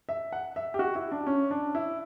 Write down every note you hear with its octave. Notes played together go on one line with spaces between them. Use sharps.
E5
F#5
E5
G4
F#4
E4
D4
C#4
D4
E4